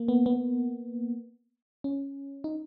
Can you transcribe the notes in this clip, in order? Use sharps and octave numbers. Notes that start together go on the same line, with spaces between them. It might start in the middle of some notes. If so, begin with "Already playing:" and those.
Already playing: A#3
B3
B3
C#4
D#4